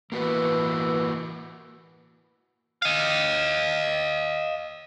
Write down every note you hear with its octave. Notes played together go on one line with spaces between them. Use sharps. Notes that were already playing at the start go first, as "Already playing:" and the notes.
E3 A#3 F#4 B4
D#5 F5